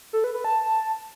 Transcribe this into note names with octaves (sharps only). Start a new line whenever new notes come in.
A4
B4
B4
A5